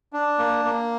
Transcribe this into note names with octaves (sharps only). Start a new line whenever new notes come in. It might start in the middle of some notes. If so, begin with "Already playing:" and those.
D4
A#3
A#3